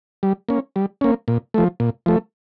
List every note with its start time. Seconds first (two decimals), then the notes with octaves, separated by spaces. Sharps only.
0.23 G3
0.49 A#3 C#4
0.76 G3
1.01 A#3 C#4
1.28 A#2
1.54 F3 A3
1.80 A#2
2.06 F3 A3